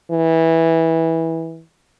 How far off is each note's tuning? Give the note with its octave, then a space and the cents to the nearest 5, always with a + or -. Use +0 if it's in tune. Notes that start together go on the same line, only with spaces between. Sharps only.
E3 -15